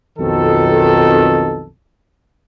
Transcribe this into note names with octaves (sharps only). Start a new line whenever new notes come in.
B1 F2 D#3 A4